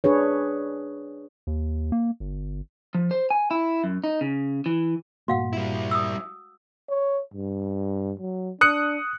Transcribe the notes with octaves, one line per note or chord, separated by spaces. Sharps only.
D4 G#4 B4 C#5
D#2
A#3
G1
F3
C5
G#5
E4
F#2
D#4
C#3
E3
G2 A#2 A#3 F#4 F5 F#5
G3 E4
D#6 E6
C#5
G2
F#3
D4 D#6 F#6 C#7